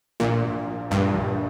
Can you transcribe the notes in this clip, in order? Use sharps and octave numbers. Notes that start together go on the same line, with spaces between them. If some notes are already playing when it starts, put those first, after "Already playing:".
A#1 A#2
A#2
F3
A#1 G2
A#1